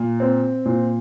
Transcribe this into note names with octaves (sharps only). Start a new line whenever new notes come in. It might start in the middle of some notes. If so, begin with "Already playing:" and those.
Already playing: A#2
C4
A#2